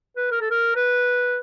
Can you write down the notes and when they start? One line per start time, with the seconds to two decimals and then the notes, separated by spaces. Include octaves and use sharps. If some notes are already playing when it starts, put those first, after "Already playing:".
0.16 B4
0.31 A#4
0.41 A4
0.51 A#4
0.76 B4